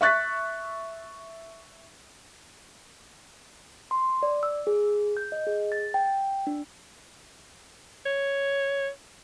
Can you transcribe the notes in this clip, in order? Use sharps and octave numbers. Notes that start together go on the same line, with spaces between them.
E5 C#6 F#6 A6 B6
C6
D5
E6
G#4
G6
D#5
G#4
A6
G5
D4
C#5